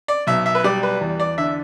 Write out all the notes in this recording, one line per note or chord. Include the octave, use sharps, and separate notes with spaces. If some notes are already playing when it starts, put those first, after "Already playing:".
D5
B1 E5
E5
B4
G3 D5
B4
E2
D5
D3 E5